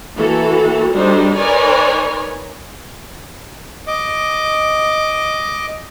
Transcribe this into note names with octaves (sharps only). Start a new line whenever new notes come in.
E3 A#3 F#4 A4
G3 D4 D#4 F#4 A4 C5
D#4 A#4 B4 C#5 D5 G#5
D#5 D6